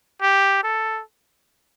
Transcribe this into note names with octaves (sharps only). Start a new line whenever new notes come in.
G4
A4